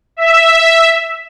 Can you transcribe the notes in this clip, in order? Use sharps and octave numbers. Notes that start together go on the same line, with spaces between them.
E5